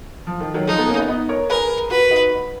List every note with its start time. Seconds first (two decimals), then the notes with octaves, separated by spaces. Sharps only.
0.27 F3
0.40 D#3
0.54 D#3 F#3
0.67 F3 G#3 D#4
0.78 G#3 B3
0.88 A#3 C#4
0.98 B3 D#4
1.09 B3 D#4
1.29 A#4 C#5
1.50 G#4 A#4 B4
1.90 F#4 A#4 B4
2.11 D#4 F#4